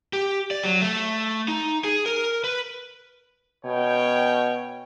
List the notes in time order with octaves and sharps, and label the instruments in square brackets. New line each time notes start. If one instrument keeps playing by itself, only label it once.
[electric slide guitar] G4
D5
F#3
A3
D#4
G#4
A#4
B4
[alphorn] B2 [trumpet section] C#4 C#5 G5